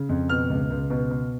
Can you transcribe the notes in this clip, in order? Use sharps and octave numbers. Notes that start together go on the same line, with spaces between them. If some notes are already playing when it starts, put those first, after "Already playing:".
Already playing: C#3
F2
B2 F6
C#2
C#2
B2
B2